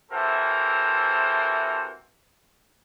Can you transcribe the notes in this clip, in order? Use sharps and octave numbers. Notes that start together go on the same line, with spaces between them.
C3 E3 F#4 A4 A#4 C5